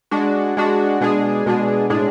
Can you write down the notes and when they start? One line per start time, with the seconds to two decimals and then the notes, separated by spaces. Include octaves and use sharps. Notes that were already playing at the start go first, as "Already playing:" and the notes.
0.11 G#3 D4 F#4
0.57 G#3 D4 F#4
1.01 B2 G#3 D4 G#4
1.46 B2 G#3 D4 G#4
1.90 A2 G#3 D4 G#4